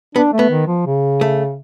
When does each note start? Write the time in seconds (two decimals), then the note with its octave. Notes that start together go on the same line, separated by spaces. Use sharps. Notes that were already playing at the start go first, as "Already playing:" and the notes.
0.15 B3 D4
0.33 A3
0.39 B3
0.50 D#3
0.67 F3
0.86 C#3
1.21 A3